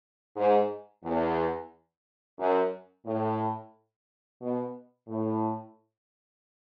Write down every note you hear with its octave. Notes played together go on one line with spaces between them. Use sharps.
G#2
E2
F#2
A2
B2
A2